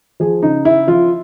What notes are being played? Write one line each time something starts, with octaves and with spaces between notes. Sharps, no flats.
F3 G#4
C#3 D#4
C#3 E4
F3 F4